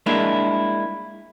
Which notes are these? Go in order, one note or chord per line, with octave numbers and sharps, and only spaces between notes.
G#3 A#3 D4 E4